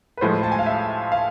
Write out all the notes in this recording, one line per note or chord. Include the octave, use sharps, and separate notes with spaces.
B4
A2 F3 G#3 C5
A5
G#5
F5
E5
F5